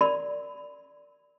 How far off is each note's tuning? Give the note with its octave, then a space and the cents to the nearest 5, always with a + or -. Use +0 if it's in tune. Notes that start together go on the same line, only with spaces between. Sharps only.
A#4 -10 D5 -5 B5 +20